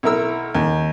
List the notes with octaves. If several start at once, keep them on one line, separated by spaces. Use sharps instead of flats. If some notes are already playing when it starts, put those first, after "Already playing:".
B1 E4 A#4 E6
D#2